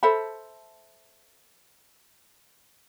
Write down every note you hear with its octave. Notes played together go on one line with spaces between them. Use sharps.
A4 C5 E5 B5